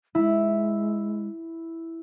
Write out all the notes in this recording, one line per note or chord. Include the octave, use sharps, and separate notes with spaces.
G#3 E4